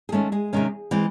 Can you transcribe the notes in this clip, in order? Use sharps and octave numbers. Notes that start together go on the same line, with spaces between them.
G#4
D#3 G#3 A3 C#4 A4
G#3 G#4
C3 D#3 G#3 C#4
E3 G#3 C4